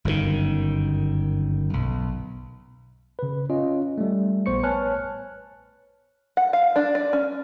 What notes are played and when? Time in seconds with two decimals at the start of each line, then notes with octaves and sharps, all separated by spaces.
0.05 G1 F#2 A2 D#3
1.73 B1
3.19 C#3 B4
3.50 C#4 F4 D#5
3.98 G3 A3
4.46 A#1 B3 C5 C#6 C#7
4.63 B4 C#5 G#5 A5 F6 F#6
6.37 F#5
6.53 F5
6.76 D4
6.95 D5
7.13 C#4